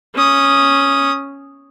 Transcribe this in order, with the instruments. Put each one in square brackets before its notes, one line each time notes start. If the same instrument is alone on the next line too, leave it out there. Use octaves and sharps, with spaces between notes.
[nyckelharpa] C#4 D#6